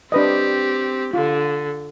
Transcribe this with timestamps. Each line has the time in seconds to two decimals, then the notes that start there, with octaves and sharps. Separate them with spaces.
0.12 C4 D4 G4 B4 D#5
1.13 D3 F4